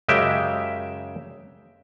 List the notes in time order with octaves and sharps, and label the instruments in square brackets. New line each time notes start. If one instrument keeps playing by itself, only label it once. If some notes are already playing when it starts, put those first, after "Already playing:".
[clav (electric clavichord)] F#2 C#3 G#3 G4 E5 G5